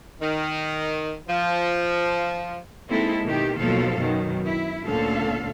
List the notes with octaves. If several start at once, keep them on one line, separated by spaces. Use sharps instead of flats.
D#3
F3
G#3 A#3 C4 D#4 E4 A4
B2 D#3 G4
D#2 B2 F3 F#3 A4 F5
F#2 B2 D#3
E4
D2 A#2 D3 C#4 A4 F5